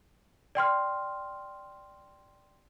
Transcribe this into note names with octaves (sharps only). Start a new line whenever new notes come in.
D5 G5 C6 F6